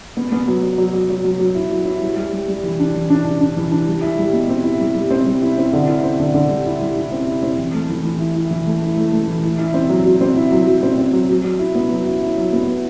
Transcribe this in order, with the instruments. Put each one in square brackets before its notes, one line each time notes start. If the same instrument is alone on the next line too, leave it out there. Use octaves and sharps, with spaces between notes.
[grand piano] B3
B3
F#3
F#3
F#3
F#3
F#3
F#3
F#3
E4
F#3
E4
G3
G3
G3
G3
E3
D4
E3
D4
D4
D4
E3
D4
G3
E4
G3
B2
C4
E4
G3
G3
C4
G3
E4
C4
D3
E4
C4
D3
D3
G3
E4
G3
E4
C4
E4
C4
E3
A3
E3
E3
E4
E4
E3
A3
E4
A3
A3
E3
E4
E4
C4
F#3
F#3
C4
E4
F#3
F#3
C4
C4
F#3
F#3
F#3
E4
B3
F#3
E4
E4
F#3
B3
E4